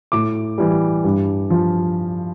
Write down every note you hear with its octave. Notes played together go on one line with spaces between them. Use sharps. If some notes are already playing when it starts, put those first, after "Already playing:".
A2 D6
E3 G3
G2
F3